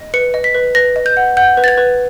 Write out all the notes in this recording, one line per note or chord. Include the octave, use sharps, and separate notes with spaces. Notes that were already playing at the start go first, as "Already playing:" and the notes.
Already playing: D#5
B4 C#7
D#5
B6
B4
B4 A#6
D#5
G6
F#5
F#5 G6
B4
A6
G#6
B4